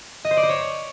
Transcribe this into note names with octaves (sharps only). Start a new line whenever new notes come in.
D#5
C5
D5
C5
C#5